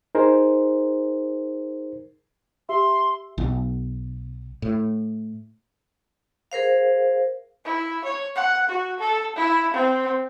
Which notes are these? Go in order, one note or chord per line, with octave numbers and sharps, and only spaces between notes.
D#4 G#4 A#4 C5
G4 E5 C6
B1
A2
G#4 A#4 C5 F5
E4
C#5
F#5
F#4
A4
E4
C4